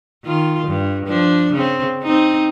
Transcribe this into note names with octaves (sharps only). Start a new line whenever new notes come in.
D#3 F4
G2
F3 D4
C#3 C4
C4 D#4